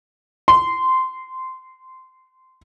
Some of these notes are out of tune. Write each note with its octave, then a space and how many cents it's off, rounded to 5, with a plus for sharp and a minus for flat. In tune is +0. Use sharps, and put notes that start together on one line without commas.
C6 -15